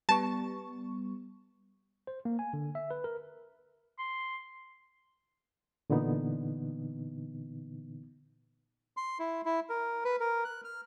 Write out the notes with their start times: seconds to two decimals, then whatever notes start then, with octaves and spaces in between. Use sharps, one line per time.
0.09 G3 B3 A5 C#6
2.07 C5
2.25 A#3
2.39 G#5
2.53 D3
2.75 E5
2.91 B4
3.04 A#4
3.99 C6
5.90 A#2 D3 E3 B3 D#4
8.97 C6
9.19 E4
9.46 E4
9.70 A#4
10.05 B4
10.20 A#4
10.45 F#6
10.64 F6